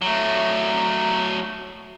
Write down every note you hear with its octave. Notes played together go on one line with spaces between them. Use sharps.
F#3 A3